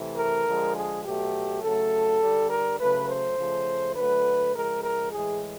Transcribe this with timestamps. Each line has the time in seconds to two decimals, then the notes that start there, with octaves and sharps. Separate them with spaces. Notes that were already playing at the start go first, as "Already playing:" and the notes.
Already playing: C3 E3 A3
0.16 A#4
0.45 D3 F3 G#3
0.75 G#4
1.04 B2 F#3 A3 G4
1.62 C#3 F#3 A3 A4
2.21 D3 G3
2.49 A#4
2.79 C#3 F#3 A3 B4
3.08 C5
3.37 C#3 F3 A3
3.95 D3 F#3 A3 B4
4.54 C#3 F3 G#3 A#4
4.83 A#4
5.12 A2 E3 G#3 G#4